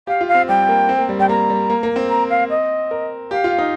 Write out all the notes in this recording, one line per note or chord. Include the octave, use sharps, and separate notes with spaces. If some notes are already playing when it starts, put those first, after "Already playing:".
G4 F5
F4
F5
C4
G3 G5
A#3
C4
A#3
G3
G3 G5
A#3 A#5
G3
A#3
A#3
C4
A#5
F5
D#5
A#4
G4 F5
F4
D#4